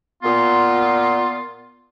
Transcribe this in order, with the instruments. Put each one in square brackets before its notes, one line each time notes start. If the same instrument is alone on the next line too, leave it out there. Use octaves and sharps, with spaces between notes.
[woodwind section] A#2 B3 F4